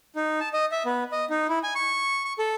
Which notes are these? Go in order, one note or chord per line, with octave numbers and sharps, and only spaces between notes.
D#4
A5
D#5
E5
B3
D#5
D#4
E4
G#5
C#6
C#6
A4